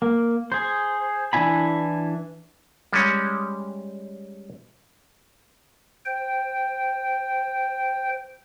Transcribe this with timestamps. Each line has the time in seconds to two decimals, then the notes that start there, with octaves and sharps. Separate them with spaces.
0.02 A#3
0.52 G#4 C5
1.33 E3 D4 E4 G#5 B5
2.93 G3 G#3 C#4
6.06 C5 G5